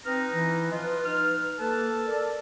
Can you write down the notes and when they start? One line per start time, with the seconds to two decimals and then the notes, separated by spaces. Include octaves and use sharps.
0.06 C4 D#4 B4 F6
0.33 E3 E4
0.71 F3 F4 D#5
1.05 D#4 F6
1.59 A#3 A4 B4 A5
2.07 A#4 D5